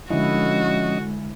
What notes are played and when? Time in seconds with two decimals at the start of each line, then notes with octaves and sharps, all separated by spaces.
0.10 D3 F3 G#3 C#4 E4 F#4 D#5